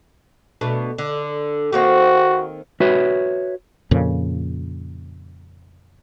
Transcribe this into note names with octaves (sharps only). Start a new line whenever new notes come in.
B2 A3 D4
D3
D#3 A#3 C4 F#4
F#4 B4 C#5 E5
F2 A#2 C#3